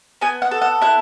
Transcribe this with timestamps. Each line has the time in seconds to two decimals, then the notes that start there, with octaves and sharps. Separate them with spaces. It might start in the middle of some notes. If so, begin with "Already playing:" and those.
0.22 B3 G#5
0.42 F#5
0.51 A4
0.62 F#5
0.81 E4 F#5